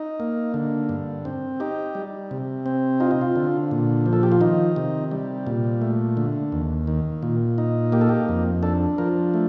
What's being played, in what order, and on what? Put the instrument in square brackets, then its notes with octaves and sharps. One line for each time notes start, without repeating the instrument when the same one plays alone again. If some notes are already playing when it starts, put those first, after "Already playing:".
Already playing: [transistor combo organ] D#4
A#3
D3
G2
C4
D#4 G4
G3
C3
C4
D#4 F4
D#4
F4
D3
A#2
F3
A4
G4
F4
D#3 D#4
C3
G3
A#2
A3
D3
D#2
D#3
A#2
D#4
A#3 G4
A4
G4
F2
D4 A4
F3 A#4
A3